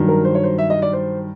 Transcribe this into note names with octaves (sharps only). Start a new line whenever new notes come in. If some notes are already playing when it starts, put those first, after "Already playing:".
Already playing: G2 D#3 F#3
A#4
C5
C#5
C5
E5
D#5
D5
C5